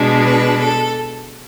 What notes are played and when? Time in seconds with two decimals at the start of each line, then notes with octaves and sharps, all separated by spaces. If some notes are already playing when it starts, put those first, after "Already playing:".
Already playing: B2 G#3 D4
0.24 B4
0.59 A4